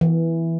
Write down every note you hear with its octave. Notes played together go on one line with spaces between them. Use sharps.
E3